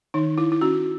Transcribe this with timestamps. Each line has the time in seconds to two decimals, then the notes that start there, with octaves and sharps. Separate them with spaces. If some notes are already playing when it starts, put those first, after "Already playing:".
0.14 D#3 D#4
0.38 E4
0.52 E4
0.61 C#4 F#4